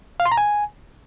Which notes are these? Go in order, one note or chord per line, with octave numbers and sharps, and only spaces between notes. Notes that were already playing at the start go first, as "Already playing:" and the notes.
F5
C6
A#5
G#5